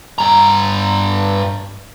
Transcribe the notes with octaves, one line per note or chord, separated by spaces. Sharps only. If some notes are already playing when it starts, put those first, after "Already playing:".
G2 A#5